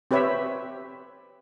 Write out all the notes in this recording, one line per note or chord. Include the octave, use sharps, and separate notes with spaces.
C4 G4 B4 C#5 E5